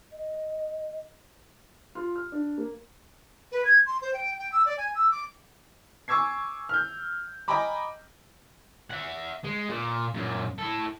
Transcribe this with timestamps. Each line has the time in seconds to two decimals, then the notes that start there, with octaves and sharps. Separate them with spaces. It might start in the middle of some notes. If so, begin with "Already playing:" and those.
0.12 D#5
1.95 F4
2.16 F6
2.32 D4
2.58 A#3
3.52 B4
3.65 G#6
3.86 C6
4.02 C5
4.13 G5
4.39 G5
4.52 E6
4.66 D5
4.77 G#5
4.95 E6
5.11 D6
6.08 G#5 C#6 D6 E6 G#6 C7
6.69 F6 G6
7.48 D#5 G5 G#5 A#5 B5 D6
8.91 E5 F#5
9.44 G#3
9.69 A#2
10.14 F#2 A#2
10.59 E4 A4